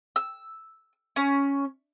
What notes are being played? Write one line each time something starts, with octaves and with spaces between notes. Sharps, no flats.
E6
C#4